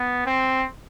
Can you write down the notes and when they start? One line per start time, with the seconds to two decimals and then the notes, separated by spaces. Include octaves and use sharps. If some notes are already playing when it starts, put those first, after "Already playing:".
Already playing: B3
0.26 C4